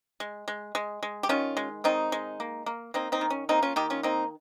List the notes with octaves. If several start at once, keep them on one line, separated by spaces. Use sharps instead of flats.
G#3
G#3
G#3
G#3
G4
D#3 C#4 F4
G#3
D#3 C4 D#4
G#3
A#3
A#3
A#3 C4 D#4
C4 D#4
D#3
C#4
A#3 C4 D#4
C#4 F4
D#3 D#4 G4
C#4 F4
A#3 C4 D#4